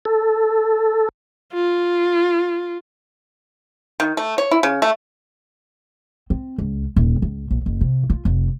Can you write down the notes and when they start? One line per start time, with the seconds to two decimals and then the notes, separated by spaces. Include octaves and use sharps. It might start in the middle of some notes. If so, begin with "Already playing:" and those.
0.05 A4
1.53 F4
4.00 D#3
4.17 A3
4.38 C#5
4.51 E4
4.63 C#3
4.82 A3
6.30 C4
6.58 C#2
6.96 D#1
7.22 C#2
7.51 A#1
7.66 F#1
7.81 C3
8.10 F4
8.25 F1